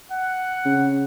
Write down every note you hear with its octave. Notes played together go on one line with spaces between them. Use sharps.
F#5
C#3